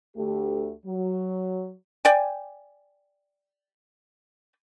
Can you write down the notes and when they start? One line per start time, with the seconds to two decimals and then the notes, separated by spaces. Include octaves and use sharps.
0.16 D2 A3 G4
0.86 F#3
2.05 D5 G5 G#5